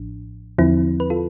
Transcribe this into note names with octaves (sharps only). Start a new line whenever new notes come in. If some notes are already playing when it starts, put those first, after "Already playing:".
Already playing: A1 A2 F3 D4
E2 D3 F3 C4 E4
B4
F4 A4